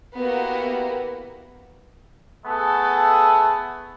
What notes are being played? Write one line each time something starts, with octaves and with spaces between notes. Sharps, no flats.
A#3 B3 E4 F#4 G4
A3 B3 G#4 A4